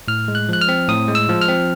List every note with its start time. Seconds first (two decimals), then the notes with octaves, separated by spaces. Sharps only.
0.08 A2 F6
0.28 G#3
0.35 F#6
0.49 F3 F#6
0.61 F6
0.69 C4
0.89 A2 D#6
1.08 G#3
1.15 E6
1.29 F3
1.41 F6
1.48 C4